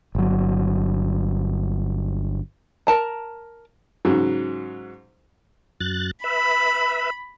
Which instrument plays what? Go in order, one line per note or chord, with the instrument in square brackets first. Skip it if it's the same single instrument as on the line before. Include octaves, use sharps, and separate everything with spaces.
[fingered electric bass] G1 F#3
[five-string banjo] A#4 A5 A#5
[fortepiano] G#2 C#3 F#3
[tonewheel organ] F#2 F#6 A6
[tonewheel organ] B4 E5 [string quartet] B5